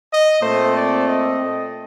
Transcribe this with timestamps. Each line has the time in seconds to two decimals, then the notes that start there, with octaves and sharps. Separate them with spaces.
0.11 D#5
0.42 A#2 A3 C4 C5
0.74 D5
1.06 D#5